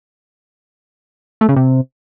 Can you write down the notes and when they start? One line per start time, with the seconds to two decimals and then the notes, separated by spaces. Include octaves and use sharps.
1.41 A3
1.49 C#3
1.56 C3